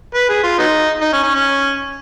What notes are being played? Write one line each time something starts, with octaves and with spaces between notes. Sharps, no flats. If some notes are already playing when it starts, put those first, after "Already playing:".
B4
G#4
F4
F#3 B3 D#4
D#4
C#4
C#4
C#4